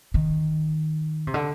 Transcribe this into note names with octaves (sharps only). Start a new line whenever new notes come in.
D#3
C3
D3